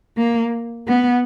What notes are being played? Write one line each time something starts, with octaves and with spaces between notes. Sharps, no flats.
A#3
B3